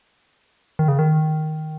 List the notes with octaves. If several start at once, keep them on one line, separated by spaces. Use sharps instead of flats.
D#3
C#3
D#3